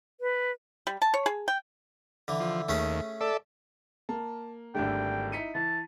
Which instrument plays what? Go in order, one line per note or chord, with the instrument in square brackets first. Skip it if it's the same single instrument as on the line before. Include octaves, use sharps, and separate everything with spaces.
[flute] B4
[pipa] G3
A5
C#5
G#4
G5
[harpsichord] D3 E3
[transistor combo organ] F3
[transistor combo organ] D#2 [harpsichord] A3 C#4 G#4
[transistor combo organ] A4 D5 E5
[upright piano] A#3 [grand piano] A5
[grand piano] G#1 D3 [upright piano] G3 A3 D4 [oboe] G5
[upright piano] D#4 E4 [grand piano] B6 C#7 D#7
[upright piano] E3 [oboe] A5